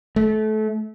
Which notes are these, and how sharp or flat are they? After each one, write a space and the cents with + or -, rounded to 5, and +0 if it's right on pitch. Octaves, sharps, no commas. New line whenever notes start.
A3 -25